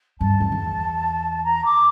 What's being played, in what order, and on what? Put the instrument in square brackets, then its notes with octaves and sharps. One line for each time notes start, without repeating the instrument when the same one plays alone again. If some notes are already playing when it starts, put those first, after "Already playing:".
[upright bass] G2 [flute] A5
[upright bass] F2
E2
[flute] A#5
D6